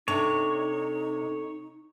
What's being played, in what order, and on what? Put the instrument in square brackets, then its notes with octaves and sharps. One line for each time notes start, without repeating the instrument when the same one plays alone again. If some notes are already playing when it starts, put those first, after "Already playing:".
[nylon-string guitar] C3 D4 [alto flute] D#4 [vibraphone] A4 [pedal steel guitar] C#5